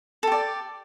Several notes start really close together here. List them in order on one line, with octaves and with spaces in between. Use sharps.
A4 G4 D5